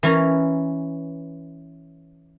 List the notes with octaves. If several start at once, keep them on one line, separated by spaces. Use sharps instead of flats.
E3 C#4 A#5